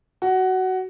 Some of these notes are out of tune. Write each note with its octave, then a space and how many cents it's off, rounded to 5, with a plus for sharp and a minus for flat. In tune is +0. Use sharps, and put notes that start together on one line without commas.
F#4 +15